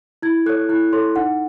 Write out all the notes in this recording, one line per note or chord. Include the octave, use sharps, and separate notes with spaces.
E4 G#6
A4 C#5 F#6
E4 F#6
A4 C#5 C6
D#4 F#5